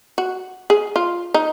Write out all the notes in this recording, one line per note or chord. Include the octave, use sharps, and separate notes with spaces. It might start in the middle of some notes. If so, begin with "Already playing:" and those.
F#4
G#4
F4
D#4